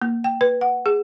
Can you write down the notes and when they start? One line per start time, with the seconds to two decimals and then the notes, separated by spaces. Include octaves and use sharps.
0.02 A#3
0.24 G5
0.41 B4
0.61 F#5
0.86 G#4